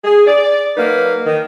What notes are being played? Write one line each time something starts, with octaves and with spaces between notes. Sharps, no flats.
G#4
D5
F#3 A#3 D#4 B4
D#3